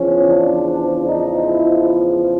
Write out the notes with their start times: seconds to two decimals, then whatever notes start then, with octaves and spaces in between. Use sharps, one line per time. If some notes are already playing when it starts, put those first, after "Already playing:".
Already playing: E2 C#3 F3 C#4
0.28 D4
1.06 D#4
1.44 E4